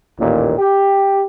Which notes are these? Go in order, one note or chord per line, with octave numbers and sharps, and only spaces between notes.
A1 D#2 A#2
G4